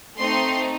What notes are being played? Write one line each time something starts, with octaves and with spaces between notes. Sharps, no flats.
A3 C4 D#4 C6